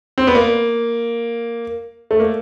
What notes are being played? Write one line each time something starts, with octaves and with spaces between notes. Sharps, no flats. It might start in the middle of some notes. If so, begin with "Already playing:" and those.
C4
B3
A#3
A3
A#3